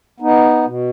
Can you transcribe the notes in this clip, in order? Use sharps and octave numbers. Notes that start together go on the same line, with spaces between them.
B3 D#4
B2